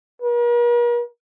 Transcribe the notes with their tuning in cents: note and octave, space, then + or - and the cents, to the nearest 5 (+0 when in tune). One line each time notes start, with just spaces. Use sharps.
A#4 +45